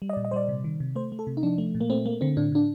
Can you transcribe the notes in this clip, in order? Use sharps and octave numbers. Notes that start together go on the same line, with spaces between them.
G3
D#5
D5
A#2
D#5
G3 C5 D5
C3
D#3
C3
A3 C5
A3
A4
C3
D#4
F3 D4
A3
A#2
A#3
A3 C4
A3 A#3
D3 C4
A2 D4
A2 D4